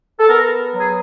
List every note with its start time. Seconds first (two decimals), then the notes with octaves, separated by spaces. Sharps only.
0.20 A4
0.29 B3 A#4
0.73 F#3
0.79 G#4